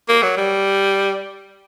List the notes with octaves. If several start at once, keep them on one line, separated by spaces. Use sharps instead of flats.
A#3
F#3
G3